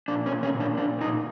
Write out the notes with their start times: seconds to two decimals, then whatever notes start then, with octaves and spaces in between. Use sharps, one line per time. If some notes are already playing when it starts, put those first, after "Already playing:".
0.08 A#2 D4
0.26 C#4
0.32 A#2
0.43 C#4
0.55 A#2
0.60 D4
0.77 A#2 D4
1.01 A#2 D#4